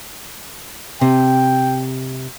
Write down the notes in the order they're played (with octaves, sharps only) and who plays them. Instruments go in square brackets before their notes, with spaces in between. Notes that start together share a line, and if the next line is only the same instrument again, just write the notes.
[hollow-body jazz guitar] C3 [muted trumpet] G5